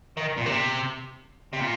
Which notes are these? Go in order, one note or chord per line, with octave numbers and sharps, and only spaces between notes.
D#3
A#2
C3
C3
A#2